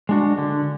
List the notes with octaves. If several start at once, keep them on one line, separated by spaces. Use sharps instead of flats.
G#3 D4 F#4
D3